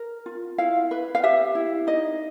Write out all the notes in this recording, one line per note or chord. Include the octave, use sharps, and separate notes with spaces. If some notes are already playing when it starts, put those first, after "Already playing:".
Already playing: A#4
F4
E4 F5
B4
F5
G4 E5
E4
D#4 D#5